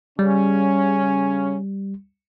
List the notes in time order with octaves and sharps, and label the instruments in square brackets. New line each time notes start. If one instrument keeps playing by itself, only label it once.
[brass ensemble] C#3 C#4 [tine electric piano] G3